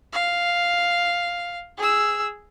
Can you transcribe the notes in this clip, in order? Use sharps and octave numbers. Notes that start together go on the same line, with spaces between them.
F5
G#4 E6